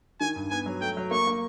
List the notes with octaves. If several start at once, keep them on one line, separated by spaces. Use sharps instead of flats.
D#3 G#5
G2
B3 G#5
F#3
A3 G5
F#3
A#3 C#6
A#3